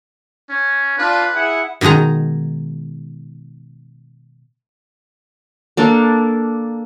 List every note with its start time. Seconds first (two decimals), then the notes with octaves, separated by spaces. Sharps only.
0.50 C#4
0.98 D4 F4 B4
1.34 E4 G#4 F#5
1.81 B2 D#3 G#3 D#4 A#5
5.77 A#3 D4 A4